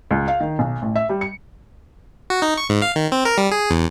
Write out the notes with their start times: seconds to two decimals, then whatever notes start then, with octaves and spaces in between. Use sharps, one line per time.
0.11 C#2
0.28 F5
0.40 D#3
0.59 B1
0.82 A1
0.96 E5
1.09 G3
1.21 C#7
2.30 F#4
2.42 D#4
2.58 C#6
2.69 G#2
2.82 F5
2.96 D#3
3.12 C4
3.25 A#4
3.38 G3
3.51 G#4
3.70 E2